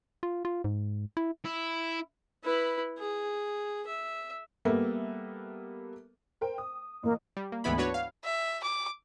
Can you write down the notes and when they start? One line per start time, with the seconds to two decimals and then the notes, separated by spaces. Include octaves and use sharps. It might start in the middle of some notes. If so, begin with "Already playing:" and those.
0.23 F4
0.45 F4
0.64 G#2
1.17 E4
1.45 E4
2.44 E4 B4
2.98 G#4
3.87 E5
4.65 G3 A#3 B3 A4 E5
6.41 A#4 C5 G5
6.58 D#6
7.03 A1 A#3
7.37 G3
7.52 A#3
7.64 D2 G#2 E3 B3 E4 B5
7.78 D4 F#4 B4 C#5
7.94 F5
8.24 E5
8.63 D6